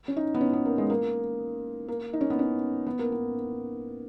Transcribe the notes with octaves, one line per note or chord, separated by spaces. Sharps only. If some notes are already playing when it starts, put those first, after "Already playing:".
C#4
D#4
B3
C#4
B3
A#3
G#3
A#3
A#3
D#4
C#4
B3
C#4
B3
A#3
B3